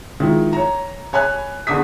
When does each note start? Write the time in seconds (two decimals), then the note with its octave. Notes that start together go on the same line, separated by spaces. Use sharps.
0.20 D#3 F3 G#3 E4
0.53 C#5 A#5
1.13 C#5 G#5 B5 F#6
1.67 E2 D3 D4 D6 D#6 B6